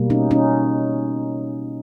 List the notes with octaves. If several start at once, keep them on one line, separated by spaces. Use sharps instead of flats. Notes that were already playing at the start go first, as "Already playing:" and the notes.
Already playing: B2 G3 A#3
C#4 D#4
C#4 D#4